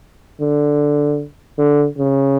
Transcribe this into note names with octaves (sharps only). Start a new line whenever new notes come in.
D3
D3
C#3